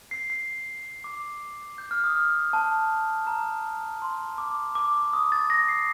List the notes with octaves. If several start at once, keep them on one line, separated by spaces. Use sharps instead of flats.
C7
C7
D6
G6
F6
D#6
F6
A5
A#5
C6
D6
D6
D6
D#6
A6
A#6
C7